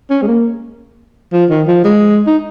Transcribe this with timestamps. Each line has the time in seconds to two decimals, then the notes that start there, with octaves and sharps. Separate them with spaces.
0.10 C#4
0.22 G#3
0.27 A#3
1.33 F3
1.50 D#3
1.68 F3
1.84 G#3
2.27 D#4